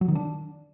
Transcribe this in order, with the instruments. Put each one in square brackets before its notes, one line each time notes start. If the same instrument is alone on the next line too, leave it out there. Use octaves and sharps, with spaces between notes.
[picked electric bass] F#3
D#3
D4